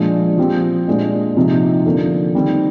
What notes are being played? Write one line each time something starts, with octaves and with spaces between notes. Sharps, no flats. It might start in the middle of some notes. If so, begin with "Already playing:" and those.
Already playing: A#2 F3 G#3 D4
F3 C4 G4
A#2 G#3 D4
C3 F3 C4 D#4 G4
D3 F3 A#3
D#3 G3 C4